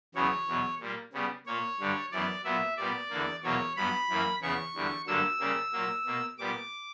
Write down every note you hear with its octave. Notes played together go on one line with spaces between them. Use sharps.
E2 C#3 F#3 B3 C#5
E2 B2 F#3
A#2 G3 A#3
C#3 G3 B3
A#2 A#3 C#5
G2 D3 G3
F#2 E3 B3 D5
A#2 F#3 B3 E5
A#2 G3 B3 D5
E2 D3 A#3
E2 B2 F#3 A#3 C#5
G2 F#3 B3 B5
F#2 E3 A#3
E2 C#3 E3 B3 C#6
E2 D3 G3
G2 D3 F#3 A#3 E6
C#3 G3 A#3
A#2 F#3 A#3
B2 A#3
A#2 G3 B3 D6